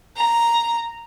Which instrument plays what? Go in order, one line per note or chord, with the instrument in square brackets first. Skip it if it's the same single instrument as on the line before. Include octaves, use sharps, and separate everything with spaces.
[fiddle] A#5